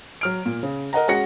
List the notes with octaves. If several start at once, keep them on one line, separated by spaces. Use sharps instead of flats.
F#3 F6 D7
A#2
C#3
A#4 D#5 F#5 A#5
G#3 C#4 F#4 F#5 A#6 C#7